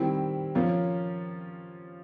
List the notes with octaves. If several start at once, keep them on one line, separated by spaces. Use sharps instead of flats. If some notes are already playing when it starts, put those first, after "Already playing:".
Already playing: D#3 G3 C4 E4
F3 A#3 C#4 F4